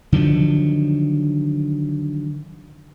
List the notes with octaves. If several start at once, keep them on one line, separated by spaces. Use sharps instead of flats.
D3 D#3 F3 F#3